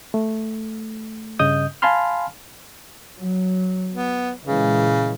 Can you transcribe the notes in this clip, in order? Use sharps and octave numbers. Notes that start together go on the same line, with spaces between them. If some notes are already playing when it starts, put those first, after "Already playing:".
A3
G2 C#3 D#5 D#6 G6
F5 G#5 A5 B5 C6 F6
F#3
B3
A#2 C#3 E3 G#3